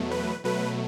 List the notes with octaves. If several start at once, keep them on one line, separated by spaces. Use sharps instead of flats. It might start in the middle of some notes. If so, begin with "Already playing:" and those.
Already playing: E2 B2 F#3 A3
B4
B2 F#3 A3 B4